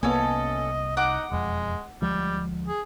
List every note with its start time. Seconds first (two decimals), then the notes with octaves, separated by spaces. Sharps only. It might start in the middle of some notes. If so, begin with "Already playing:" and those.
0.03 C2 A#3 B3 C#4 A4 D#5
0.97 D#4 F#5 D6
1.31 E1 F2 G#3
2.02 D2 F3 G3 G#3
2.68 G#4